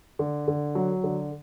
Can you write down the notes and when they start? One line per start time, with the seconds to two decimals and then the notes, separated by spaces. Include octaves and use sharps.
0.19 D3
0.48 D3
0.75 F#3
1.04 D3